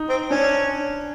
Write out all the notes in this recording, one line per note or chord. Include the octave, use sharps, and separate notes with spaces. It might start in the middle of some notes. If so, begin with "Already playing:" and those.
Already playing: D#4
C4
C#4 D4